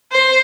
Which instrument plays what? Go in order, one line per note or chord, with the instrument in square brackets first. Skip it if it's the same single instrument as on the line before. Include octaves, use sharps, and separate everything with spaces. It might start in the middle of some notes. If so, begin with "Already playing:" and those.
[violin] C5